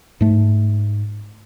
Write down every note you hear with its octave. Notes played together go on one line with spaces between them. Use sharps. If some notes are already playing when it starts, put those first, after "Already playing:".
G#2 A3